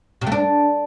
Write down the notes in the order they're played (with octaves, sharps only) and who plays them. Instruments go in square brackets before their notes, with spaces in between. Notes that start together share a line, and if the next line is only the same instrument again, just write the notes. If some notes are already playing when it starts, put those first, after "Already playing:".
[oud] C3
A3
D4